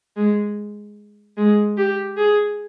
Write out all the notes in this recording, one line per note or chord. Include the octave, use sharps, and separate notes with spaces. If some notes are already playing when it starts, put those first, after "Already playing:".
G#3
G#3
G4
G#4